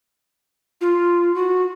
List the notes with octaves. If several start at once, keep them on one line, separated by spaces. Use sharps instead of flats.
F4
F#4